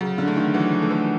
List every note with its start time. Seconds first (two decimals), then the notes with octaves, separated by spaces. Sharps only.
0.01 C#3 F#3
0.18 D3
0.28 A3
0.36 D#3
0.54 E3 F#3
0.73 F3
0.82 A3
0.91 E3